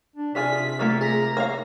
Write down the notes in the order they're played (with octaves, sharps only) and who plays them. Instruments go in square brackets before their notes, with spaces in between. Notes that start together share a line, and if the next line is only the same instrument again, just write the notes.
[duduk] D4
[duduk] C3 [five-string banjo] D4 F4 G#4 [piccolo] B6
[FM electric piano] A3 A6 [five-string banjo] A#3 F4
[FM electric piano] G#4 A#4 [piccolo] A#5
[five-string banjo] A#3 F5 [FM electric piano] C#5